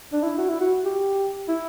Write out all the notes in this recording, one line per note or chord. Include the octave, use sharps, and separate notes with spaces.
D4
E4
F#4
E4
F#4
G4
E4